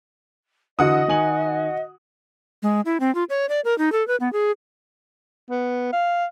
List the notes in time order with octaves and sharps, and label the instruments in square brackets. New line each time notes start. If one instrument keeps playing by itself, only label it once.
[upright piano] D3 E3 [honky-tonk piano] F#4 F#5 D#6 [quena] D#5
[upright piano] D#3 G#5 F#7
[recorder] G#3
E4
C4
F4
C#5
D5
A#4
D#4
A4
B4
B3
G#4
[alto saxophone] B3
F5